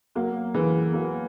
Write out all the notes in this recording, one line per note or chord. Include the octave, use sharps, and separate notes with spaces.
F#3 A#3
E3 G#3
F#3 A#3